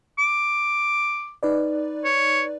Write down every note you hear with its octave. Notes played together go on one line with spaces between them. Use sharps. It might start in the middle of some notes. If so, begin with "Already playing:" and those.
D6
D#4 B4 D5
C#5